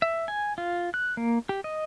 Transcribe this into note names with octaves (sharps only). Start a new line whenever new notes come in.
E5
G#5
F4
F#6
A#3
G4
D#5